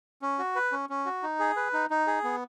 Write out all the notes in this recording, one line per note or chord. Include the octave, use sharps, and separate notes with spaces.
C#4
F#4
B4
C#4
C#4
F#4
D#4
G#4
B4
D#4
D#4
G#4
B3